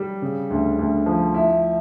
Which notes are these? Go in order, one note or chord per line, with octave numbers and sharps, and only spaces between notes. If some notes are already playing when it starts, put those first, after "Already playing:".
Already playing: G3
C#3
D2
D2
F3
E4